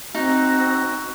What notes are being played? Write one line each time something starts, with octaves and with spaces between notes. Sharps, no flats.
C4 D#4 F#4